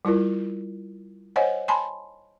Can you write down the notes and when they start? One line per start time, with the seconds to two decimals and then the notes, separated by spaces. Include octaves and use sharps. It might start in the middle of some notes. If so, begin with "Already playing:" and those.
0.05 G3 E4 F4 A#4
1.36 C5 C#5 D#5 F#5 G#5
1.68 G#5 A5 B5 C6